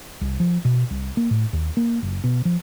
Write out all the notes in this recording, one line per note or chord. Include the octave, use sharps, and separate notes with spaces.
C2
F3
B2
C2
A#3
A2
D#2
A#3
F#1
B2
F3